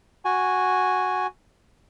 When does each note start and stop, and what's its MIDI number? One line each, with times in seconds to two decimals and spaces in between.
0.25 1.27 66
0.25 1.27 80